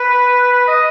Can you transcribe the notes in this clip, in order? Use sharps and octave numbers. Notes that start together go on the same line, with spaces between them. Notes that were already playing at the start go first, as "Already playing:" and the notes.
Already playing: B4
B4
D#5